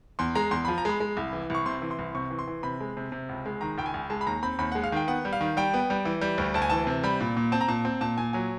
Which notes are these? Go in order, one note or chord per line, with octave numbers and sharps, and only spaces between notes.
E2 C6
G#3 A#5
E2 C6
F3 B5
A#5
G#3 B5
G#3
C2
E3
C2 C#6
C3 C6
E3
C6
C2
C3 C#6
E3
C6
E3
C3 B5
G#3
C3
C3
C#2
G#3
D#3 A#5
C#2 G5
G#5
C#2
G#3 A5
B5
D#2 A#5
C4 B5
D#2 B5
G#3 F#5
F5
D#3 G5
B3 F#5
G3
F5
D#3
G3 G5
B3
G3
E3
G3
D2
D2 A5
G#5
E3 A5
C3
G3 B5
A#2
A#2
C4 A5
A#5
A#2 A5
C4
A#2 A5
A#2 G#5
F#3 G#5